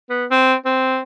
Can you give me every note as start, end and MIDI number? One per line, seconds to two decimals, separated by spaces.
0.10 0.25 59
0.31 0.54 60
0.65 1.01 60